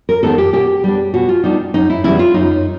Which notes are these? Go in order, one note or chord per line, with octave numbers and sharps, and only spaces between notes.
A#4
D#3 G#3 B3 D#4 A4
G4
B2 G4
G3 B3 D4
B2 F#4
F4
G3 B3 D4 D#4
F#2 D#4
E4
C#3 E3 G3 B3 E4
F4
F#2 D#4